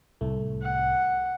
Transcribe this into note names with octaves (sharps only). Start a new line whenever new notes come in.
C2 A2 A3
F#5